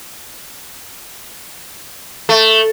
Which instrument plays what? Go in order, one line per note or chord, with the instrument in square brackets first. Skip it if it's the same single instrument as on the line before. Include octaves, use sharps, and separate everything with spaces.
[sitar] A3